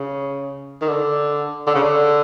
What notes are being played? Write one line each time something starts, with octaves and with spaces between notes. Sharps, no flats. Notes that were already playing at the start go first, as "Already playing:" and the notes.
Already playing: C#3
D#3
D3
D3
C#3
D3